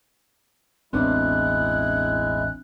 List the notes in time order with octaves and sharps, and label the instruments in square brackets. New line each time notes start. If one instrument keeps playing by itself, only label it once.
[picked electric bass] E1 A1 B3 [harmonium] G#3 E4 [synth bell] C4 D4 [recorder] F#6